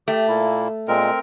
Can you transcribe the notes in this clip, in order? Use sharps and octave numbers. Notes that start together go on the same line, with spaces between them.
A3 G4
A#2 A#3 E4
A#2 G#3 C4 A#4